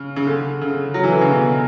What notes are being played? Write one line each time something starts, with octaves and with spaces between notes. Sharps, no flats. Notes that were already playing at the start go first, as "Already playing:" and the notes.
Already playing: C#3
C#3
D3
C#3
F#3
E3
D3
C#3
B2